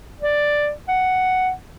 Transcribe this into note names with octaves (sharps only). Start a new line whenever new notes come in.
D5
F#5